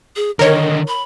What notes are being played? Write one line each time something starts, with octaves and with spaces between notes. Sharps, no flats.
G#4
D3 D#3 A#4 C#5 D#5
B5